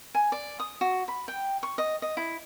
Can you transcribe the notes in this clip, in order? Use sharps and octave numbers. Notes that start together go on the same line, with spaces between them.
G#5
D5
D#6
F#4
B5
G5
C#6
D#5
D#5
E4